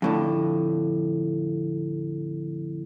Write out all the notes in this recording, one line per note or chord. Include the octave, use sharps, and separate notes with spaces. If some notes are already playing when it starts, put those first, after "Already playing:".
F2 A2 D3